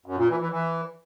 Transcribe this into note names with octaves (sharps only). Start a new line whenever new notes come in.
F#2
A#2
E3
E3
E3